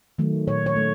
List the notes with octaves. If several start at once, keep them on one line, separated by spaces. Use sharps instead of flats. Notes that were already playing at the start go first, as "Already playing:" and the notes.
D#3 F#3 A3
A#2 C#5
C#5
A3